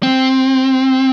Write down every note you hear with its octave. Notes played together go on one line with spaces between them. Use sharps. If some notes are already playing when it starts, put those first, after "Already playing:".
C4